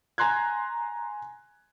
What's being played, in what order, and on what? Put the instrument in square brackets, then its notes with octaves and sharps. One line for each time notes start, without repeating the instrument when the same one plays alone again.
[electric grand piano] G#5 A#5 C6 F#6 G#6